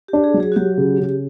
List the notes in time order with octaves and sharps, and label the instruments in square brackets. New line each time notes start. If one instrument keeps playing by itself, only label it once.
[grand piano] D4 [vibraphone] G4
[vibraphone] G#4
[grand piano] F#3
[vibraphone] G#4
F#4
[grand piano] F#3 [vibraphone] G4
[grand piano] C#3
C#3